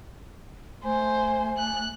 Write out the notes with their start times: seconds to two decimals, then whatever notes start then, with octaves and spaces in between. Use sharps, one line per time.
0.84 A3 C5 G#5
1.58 F#6